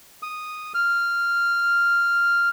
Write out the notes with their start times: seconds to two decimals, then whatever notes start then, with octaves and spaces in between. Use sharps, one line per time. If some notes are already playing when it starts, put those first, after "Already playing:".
0.23 D#6
0.75 F6